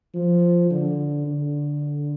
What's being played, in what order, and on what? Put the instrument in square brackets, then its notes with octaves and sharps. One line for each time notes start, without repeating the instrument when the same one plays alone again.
[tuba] F3
D3
D3